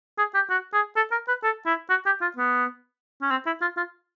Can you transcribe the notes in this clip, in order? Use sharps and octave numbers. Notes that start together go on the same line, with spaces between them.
G#4
G4
F#4
G#4
A4
A#4
B4
A4
E4
F#4
G4
F4
B3
C#4
C4
E4
F4
F4